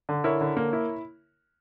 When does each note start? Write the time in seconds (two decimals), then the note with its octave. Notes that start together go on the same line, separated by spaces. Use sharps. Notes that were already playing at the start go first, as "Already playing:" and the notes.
0.09 D3
0.24 E4 A#4 C#5
0.41 D3
0.57 A#3
0.73 E4